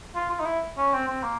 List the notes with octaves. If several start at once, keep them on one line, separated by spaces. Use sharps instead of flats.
F4
F4
D#4
E4
C#4
C4
C4
A#3